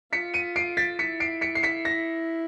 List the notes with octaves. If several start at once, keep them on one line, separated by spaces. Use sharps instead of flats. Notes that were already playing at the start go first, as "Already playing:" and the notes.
F4 B6 C#7
C#7 D#7
C7 D7
A6 B6
E4 B6 C#7
C7 D7
B6 C#7
C7
B6 C#7
A#6